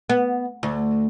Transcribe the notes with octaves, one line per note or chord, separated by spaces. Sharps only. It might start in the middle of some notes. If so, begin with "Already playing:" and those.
B3
D2